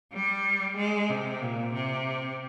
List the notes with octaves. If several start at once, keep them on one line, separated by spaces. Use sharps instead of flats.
G3
G#3
C3
A#2
C3